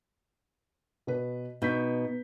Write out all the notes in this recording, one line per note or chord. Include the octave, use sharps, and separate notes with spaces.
B2 B4
B2 D#4 G6 B6